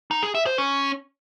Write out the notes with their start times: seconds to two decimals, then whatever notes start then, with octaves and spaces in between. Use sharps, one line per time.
0.11 D#4
0.23 G#4
0.35 E5
0.46 C5
0.58 C#4